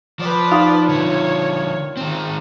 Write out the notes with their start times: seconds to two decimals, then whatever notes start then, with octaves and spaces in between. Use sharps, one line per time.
0.19 F3 B4 D5
0.51 D#4 F4
0.89 D3 F3 C#5
1.97 D#3 C4